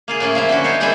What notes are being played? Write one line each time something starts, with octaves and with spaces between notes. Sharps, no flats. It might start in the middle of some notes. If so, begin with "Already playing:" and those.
A#3 F4 G#4
A2 A#3 C#4 F4
F3 A#3 E4
D3 C#4 E4 F#4
D#4 F4 C5 C#5
D#3 E3 G#3 C4 D4 E4